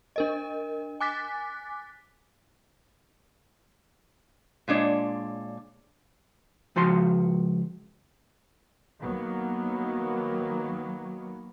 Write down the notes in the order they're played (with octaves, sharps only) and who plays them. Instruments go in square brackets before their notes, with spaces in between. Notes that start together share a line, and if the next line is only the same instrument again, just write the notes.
[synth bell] D4 A#4 D#5
G#5 D6 F#6 A6 B6
[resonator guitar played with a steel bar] A#2 G#3 D4 C#5
[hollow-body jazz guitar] C#2 F3 F#4 C6
[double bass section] D#3 F#3 A#3 B3